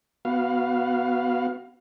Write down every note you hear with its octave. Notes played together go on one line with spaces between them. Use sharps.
B3 F#4 F5